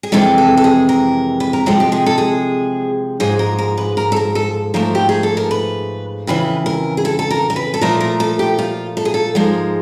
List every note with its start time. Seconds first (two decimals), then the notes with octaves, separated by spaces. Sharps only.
0.03 G#4
0.12 F2 C3 E3 G#3 A4
0.38 A4
0.57 A4
0.64 G#4
0.89 A#4
1.40 B4
1.53 A#4
1.66 C3 F3 G#3 A4
1.80 G4
1.92 G#4
2.06 A4
2.18 G#4
3.20 G#2 F3 G#3 G#4
3.39 A#4
3.59 A#4
3.78 B4
3.97 A#4
4.12 A4
4.16 A#4
4.35 A4
4.74 G#2 F3 A3 A#4
4.95 G4
5.09 G#4
5.23 A4
5.37 A#4
5.51 B4
6.27 F2 C#3 E3 B4
6.66 A#4
6.97 G#4
7.05 A4
7.19 A4
7.31 A#4
7.50 A#4
7.56 B4
7.74 A4
7.81 A#2 F3 A3 A#4
8.01 A#4
8.20 A4
8.39 G4
8.59 F4
8.97 A4
9.05 G#4
9.14 A4
9.35 G#2 F3 G#3 A#4